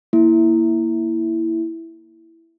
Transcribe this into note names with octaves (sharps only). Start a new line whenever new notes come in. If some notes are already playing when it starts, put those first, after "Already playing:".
A#3 E4